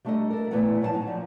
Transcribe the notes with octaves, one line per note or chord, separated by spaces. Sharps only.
G3 A3 D4 D#4 A4 D#5
A4 A#4
A#2 E3 A3 B3 E4 F#5
A#2 F3 F#3 C#5 F#5 A5
F#3 D#4
A#2 F3